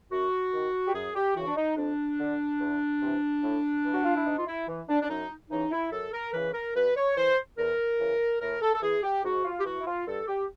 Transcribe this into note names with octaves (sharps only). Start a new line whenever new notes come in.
F#2 F#4
D#3
G4
F#2 G#4
G4
C#3 E3 F#4
D4
D#4
F2 D4
D3
E2
C3 E3
A2
E3
F#4
F4
E4
G#2 D#4
F4
E4
E3
D4
D4
F#2 D#4
C#3 E3 D#4
E4
F#2 A4
A#4
C#3 E3 B4
A#4
G2 B4
C#5
E3 C5
E2 A#4
C#3 E3
A2 A#4
A4
A4
E3 G#4
G4
G#2 F#4
F4
G4
E3 F#4
E4
F4
G2 A4
G4